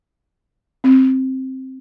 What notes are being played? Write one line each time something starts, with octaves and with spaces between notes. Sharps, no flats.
C4